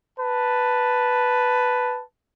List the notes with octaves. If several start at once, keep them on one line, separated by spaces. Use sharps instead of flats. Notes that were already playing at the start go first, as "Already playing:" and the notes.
B4 A5